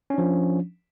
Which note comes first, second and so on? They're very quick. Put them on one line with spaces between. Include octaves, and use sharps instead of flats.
C#4 D4 F3